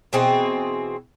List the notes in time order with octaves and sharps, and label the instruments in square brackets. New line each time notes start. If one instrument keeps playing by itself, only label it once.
[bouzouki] B2 E3 C4 G#4